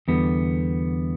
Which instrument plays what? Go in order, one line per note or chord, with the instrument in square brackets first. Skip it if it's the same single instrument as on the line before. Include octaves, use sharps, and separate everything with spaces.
[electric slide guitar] E2 D3 G3 B3